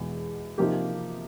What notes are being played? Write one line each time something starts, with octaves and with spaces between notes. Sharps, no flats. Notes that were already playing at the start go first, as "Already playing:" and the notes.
Already playing: E2 B2 G#3
C3 F3 A#3 D#4 G4